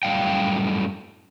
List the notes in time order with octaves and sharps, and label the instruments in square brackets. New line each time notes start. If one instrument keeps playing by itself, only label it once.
[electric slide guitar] F#2 A2 C#3 G3 F5 G5